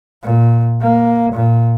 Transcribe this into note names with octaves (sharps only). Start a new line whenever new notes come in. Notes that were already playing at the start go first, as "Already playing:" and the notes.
A#2
A#3
A#2